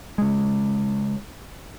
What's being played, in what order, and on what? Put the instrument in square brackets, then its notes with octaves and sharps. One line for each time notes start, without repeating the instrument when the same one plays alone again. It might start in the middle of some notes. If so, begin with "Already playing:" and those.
[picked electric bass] C#3 G#3